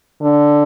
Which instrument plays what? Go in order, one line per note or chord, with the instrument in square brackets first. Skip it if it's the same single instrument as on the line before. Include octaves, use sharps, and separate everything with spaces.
[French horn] D3